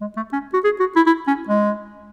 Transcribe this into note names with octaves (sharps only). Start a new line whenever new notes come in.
G#3
A3
C#4
F#4
G#4
F#4
E4
E4
C#4
G#3